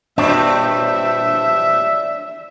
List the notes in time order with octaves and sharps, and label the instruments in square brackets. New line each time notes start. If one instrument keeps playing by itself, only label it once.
[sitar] G2 A#2 C4 [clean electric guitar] D4 C#5 [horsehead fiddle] E5